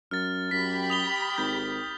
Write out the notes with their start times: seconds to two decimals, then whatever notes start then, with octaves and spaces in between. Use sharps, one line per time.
0.11 F#2 F6 A6
0.51 F#2 G4 B5 B6
0.90 D#6 F7 G7
1.38 G#1 G6